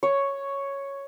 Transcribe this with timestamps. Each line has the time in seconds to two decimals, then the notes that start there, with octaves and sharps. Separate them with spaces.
0.03 C#5